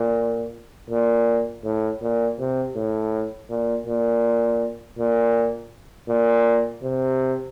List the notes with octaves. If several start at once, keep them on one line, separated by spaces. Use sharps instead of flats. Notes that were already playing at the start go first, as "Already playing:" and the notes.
Already playing: A#2
A#2
A2
A#2
C3
A2
A#2
A#2
A#2
A#2
C3